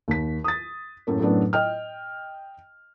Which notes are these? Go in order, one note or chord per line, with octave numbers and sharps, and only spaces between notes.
D#2 B6
D#6 A6
F#2 A2 A3 A#3
F#2 A2 F#3 A3 B3 D4
D#5 G5 F6